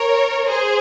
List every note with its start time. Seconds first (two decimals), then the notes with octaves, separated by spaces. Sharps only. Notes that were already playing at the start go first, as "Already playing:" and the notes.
Already playing: A#4 C#5
0.49 G#4 C5